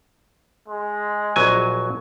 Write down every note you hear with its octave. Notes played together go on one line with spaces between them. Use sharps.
G#3
A#1 F#3 G#5